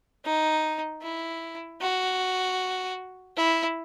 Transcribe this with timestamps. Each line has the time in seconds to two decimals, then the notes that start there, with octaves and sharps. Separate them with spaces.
0.25 D#4
1.02 E4
1.81 F#4
3.37 E4